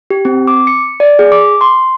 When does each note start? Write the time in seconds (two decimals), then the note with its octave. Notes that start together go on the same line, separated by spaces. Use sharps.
0.10 G4
0.25 C4
0.47 D6
0.67 C#7
1.00 D5
1.19 G#4
1.32 D6
1.61 C6